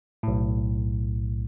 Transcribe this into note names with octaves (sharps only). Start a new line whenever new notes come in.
B1 A2